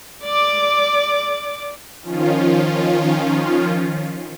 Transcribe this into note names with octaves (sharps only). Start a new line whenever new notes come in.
D5 D6
D#3 F3 C#4 F4